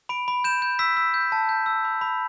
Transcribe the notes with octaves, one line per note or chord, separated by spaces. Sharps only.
B5 D7
B5
G6 E7
G6
E6 B6
E6
G6
A5
G6
E6
B5
B5